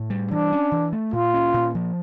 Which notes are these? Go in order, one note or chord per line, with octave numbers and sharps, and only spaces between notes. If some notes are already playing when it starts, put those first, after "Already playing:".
Already playing: A2
G3
E3 D4
C#4
E3
A3
A#2 F4
C#4
A#2
F3